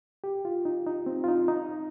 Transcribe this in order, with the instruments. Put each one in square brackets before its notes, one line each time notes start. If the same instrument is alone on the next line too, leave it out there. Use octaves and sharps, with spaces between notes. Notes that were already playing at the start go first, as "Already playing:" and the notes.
[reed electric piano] G4
F4
D#4
D#4
C4
F4
D#4
D#4